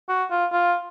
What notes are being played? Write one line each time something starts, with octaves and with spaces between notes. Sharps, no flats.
F#4
F4
F4